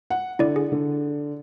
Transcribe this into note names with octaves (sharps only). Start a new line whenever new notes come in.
F#5
D3 E4 D5
G#4
D3